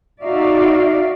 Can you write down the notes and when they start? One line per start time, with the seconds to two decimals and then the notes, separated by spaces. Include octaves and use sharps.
0.23 D#4 F#4 D5 E5 F5